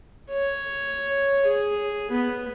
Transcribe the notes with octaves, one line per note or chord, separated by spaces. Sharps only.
C#5
G#4
B3